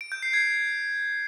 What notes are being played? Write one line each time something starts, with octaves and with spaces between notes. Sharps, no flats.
D7
G6
C7
G#6